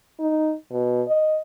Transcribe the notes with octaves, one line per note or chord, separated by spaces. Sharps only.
D#4
B2
D#5